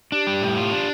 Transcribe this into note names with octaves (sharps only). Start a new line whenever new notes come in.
D4 G4
G3
A2
F4
D4